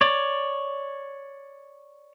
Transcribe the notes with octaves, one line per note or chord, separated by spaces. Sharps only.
C#5 D5